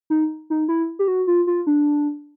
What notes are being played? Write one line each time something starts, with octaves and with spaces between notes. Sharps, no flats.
D#4
D#4
E4
G4
F#4
F4
F4
D4